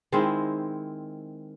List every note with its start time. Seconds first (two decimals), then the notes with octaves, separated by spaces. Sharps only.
0.12 D#3 G#3 C4 E4